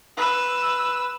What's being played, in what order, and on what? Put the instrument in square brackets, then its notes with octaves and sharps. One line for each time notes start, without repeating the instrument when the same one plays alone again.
[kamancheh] B4 E6